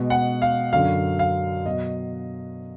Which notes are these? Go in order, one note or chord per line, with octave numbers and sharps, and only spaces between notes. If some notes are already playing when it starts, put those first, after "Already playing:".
Already playing: B2 G#3
F#5
F5
F#2 D3 F#3 F5
F5
B2 F#3 D#5